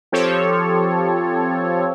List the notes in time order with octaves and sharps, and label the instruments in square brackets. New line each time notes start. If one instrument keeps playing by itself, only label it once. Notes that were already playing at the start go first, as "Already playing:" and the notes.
[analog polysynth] F3 C4 G4 A4 C#5